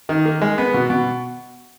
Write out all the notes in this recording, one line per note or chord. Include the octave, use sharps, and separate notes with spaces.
D#3
A#3
G#3
B3
B2
B2